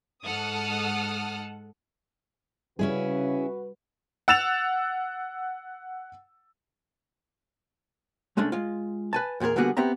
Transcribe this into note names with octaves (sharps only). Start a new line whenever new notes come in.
G#2 A4 F#5 D#6 F6
C#3 G3 C#4 E4 F#4 G#4 B4
F#5 E6 A6 E7 F7
C2 G#3 A3 C#4 D4
G#3 F4
B4 G#5 A5
E2 A#2 G4 G#4 A#4
D3 G3 A#3 B3 F#4 G#4
B3 C4 G4 E5 A#5